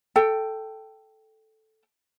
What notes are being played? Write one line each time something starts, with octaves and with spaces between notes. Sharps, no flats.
A4 G5